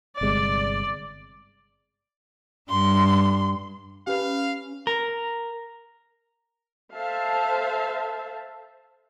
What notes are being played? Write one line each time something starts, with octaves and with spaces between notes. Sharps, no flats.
G1 C3 G#3 D5
G2 C6
C#4 G4 B4 F5
A#4
A4 C5 E5 F5 A5